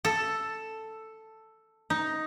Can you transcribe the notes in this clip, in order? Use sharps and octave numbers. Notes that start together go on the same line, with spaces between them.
A4
D#4